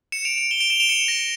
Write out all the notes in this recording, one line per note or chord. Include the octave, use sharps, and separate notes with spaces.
C#7 E7
D7 F7
D7 F7
E7 G7
D7 F7
E7 G7
D7 F7
C#7 E7
A#6 D7